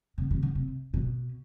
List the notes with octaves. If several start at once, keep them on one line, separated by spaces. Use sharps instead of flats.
C3
C3
D3
C3
B2